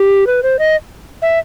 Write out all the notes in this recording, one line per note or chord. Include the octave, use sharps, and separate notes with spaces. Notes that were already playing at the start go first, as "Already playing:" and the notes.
Already playing: G4
B4
C5
D#5
E5